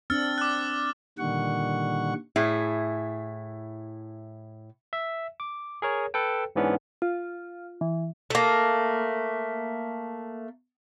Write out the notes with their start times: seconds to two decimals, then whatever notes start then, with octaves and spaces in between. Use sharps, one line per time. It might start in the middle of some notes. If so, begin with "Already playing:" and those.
0.10 C4 D4 E6 F6 A6
0.38 D6 F#6
1.18 A#2 D3 D#3 G3 F#5 C#6
2.36 A2 E4 G#4
4.93 E5
5.40 D6
5.82 G#4 A#4 C#5
6.14 A4 B4 G5
6.56 G#2 E3 B3 C#4 D4
7.02 F4
7.81 E3
8.30 A3 A#3